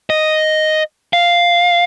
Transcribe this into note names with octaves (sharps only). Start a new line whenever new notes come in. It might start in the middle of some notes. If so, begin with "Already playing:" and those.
D#5
F5